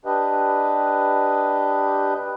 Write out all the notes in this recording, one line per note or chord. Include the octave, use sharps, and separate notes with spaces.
D4 G4 B4 D#5